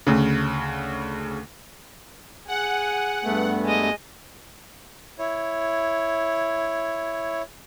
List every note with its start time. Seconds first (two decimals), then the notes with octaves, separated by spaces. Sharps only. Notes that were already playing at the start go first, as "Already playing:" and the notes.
0.07 D2 C#3
2.48 G#4 F#5
3.24 G2 A3 B3
3.64 G#3 D#5
5.19 E4 C#5